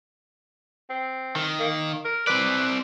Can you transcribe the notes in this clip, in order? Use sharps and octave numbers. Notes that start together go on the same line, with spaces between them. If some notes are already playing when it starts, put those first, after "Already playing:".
C4
D#3
A#3
A#4
C4 B4 D5